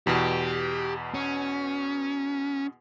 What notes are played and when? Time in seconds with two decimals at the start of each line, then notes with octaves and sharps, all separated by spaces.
0.07 E2 B2 G4
1.14 C#4